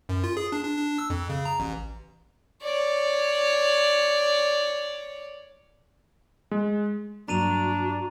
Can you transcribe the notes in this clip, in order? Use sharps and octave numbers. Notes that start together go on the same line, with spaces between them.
F#2
F4
G#4
D4
D4
D4
E6
F2
C#3
A#5
A1
C#5 D5
G#3
G2 F#3 A#3 D4 F#4 A#5 D#7 F7